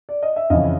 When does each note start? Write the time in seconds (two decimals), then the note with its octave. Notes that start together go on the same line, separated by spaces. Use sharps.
0.09 D5
0.23 D#5
0.36 E5
0.50 F2 C#3 E3 D#5 F5